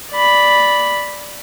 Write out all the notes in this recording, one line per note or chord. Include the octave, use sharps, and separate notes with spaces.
D5 B5